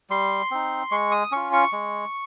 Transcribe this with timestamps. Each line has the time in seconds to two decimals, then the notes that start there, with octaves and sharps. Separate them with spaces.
0.10 G3 C6
0.51 C4 D#4
0.91 G#3 C#6
1.12 D#6
1.32 C#4 F4 C#6
1.53 C#6
1.73 G#3